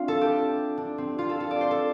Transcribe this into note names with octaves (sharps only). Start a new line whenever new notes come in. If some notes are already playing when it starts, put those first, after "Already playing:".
Already playing: A3 C4 D4 F4
A4
G4
D4
C4
F4
A4
A4
D5
C5
A4